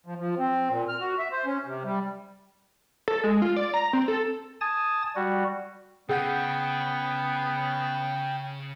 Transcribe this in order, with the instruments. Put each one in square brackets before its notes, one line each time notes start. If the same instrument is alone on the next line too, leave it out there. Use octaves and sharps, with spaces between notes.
[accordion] F3
F3
C4
A#2
F6
F#4
E5
C5
C#4
C3
G3
[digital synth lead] A4
G#3
F4
D5
A#5
C4
A4
[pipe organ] G#5 A5 D#6 A6
G3 F#4
[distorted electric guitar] C#3 C#4 [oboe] B3 [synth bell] G#4 F#5 G6 [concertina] G5